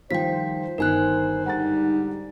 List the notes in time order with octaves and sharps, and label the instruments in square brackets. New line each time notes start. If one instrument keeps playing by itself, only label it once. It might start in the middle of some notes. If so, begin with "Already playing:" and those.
[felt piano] D#3 F3 G3 [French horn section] C5 [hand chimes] G5 B6
[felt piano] G1 D#3 [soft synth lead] D#4 [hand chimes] A#4 G#5 F#6
[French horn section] G#2 D3 G3 [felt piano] F#5 A#5 A6